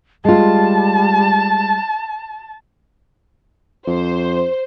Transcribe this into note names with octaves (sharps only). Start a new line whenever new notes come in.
G3 G#3 F4 A5
F2 C5